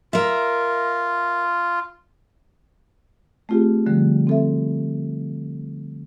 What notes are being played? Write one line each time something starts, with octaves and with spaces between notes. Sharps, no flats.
F4 A#4 E5
A3 C4 F4 G4 G#4
D3 F3 G3 A3
C4 A4 E5